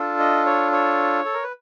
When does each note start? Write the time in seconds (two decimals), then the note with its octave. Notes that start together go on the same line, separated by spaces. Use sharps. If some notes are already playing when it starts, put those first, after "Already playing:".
Already playing: D4 F4 A4
0.19 D#5
0.46 C#5
0.72 C#5
1.25 A4
1.34 A#4
1.43 B4